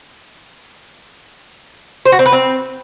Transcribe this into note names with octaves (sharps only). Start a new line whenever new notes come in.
C5
F#4
C4
B4
C4